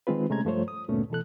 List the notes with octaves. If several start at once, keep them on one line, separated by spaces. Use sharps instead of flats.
D#3 G#3 C4 F4 B4
C3 G#3 A3 C#4 A#5 G#6
G2 F3 A3 F4 C5 C#5
D#6
D2 G2 A#2 A3 B3 C#4
B2 E3 A4 F#6